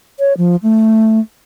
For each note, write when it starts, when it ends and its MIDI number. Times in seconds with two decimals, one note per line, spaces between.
0.19 0.33 73
0.38 0.56 53
0.63 1.19 57